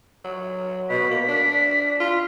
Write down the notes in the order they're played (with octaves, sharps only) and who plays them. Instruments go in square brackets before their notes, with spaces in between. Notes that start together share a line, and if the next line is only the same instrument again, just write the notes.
[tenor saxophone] F#3
[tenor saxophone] B2 [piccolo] B6
[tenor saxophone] A#3
D4
F4